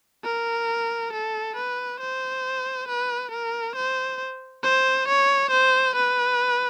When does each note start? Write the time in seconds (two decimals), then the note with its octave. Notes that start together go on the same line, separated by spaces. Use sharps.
0.25 A#4
1.13 A4
1.57 B4
2.01 C5
2.88 B4
3.32 A#4
3.76 C5
4.64 C5
5.08 C#5
5.51 C5
5.96 B4